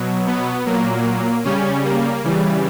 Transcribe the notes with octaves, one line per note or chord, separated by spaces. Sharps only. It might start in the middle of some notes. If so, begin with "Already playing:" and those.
Already playing: B2 F#3
B3
A#2 F#3 A#3
C#3 G3 C#4
A#3
C#3 E3 G3